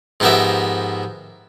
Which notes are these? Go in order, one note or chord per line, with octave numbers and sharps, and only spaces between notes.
G#2 F3 B3 G4 A#4 E5